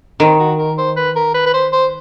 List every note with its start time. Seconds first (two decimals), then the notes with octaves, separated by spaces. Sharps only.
0.20 D#3 C4
0.39 F#4
0.59 A#4
0.78 C5
0.97 B4
1.16 A#4
1.34 B4
1.46 B4
1.54 C5
1.72 C5